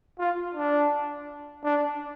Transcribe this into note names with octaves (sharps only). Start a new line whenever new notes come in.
F4
D4
D4